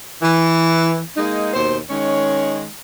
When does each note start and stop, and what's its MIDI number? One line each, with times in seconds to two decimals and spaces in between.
0.22 1.00 52
1.17 1.53 56
1.17 1.53 58
1.17 1.53 63
1.54 1.77 39
1.54 1.77 47
1.54 1.77 72
1.90 2.65 51
1.90 2.65 56
1.90 2.65 61
1.90 2.65 73